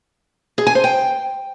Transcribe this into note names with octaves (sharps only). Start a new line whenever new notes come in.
G#4
G#5
C5
G5